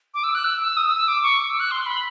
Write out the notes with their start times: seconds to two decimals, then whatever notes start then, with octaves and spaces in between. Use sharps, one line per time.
0.14 D6
0.24 E6
0.35 F#6
0.45 E6
0.61 E6
0.77 D#6
0.87 E6
0.98 E6
1.08 D6
1.23 C#6
1.40 D6
1.50 E6
1.60 F#6
1.71 C6
1.86 B5